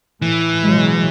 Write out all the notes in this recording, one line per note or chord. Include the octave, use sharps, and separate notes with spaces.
A2 E3
B2 F#3 G#3